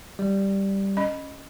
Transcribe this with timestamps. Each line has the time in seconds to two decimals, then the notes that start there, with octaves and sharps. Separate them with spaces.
0.19 G3
0.97 C#4 D#5 B5